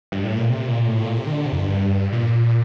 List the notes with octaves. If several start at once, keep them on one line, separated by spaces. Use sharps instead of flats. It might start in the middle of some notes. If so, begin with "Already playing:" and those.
G2
A2
A#2
C3
A#2
A2
A#2
C3
D#3
D3
C3
F2
G2
A#2